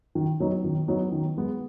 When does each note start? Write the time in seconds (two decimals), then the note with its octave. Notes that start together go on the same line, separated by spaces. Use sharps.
0.15 D#3
0.40 F#3 B3 D#4
0.64 D#3
0.88 F#3 B3 D#4
1.12 D#3
1.37 G#3 B3